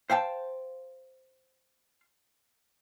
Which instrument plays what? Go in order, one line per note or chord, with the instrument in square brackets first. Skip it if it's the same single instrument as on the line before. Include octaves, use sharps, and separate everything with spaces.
[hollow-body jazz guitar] C5 F5 G5 A5